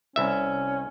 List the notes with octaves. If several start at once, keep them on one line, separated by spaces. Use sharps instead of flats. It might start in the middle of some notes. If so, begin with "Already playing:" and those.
C2 C#4 E5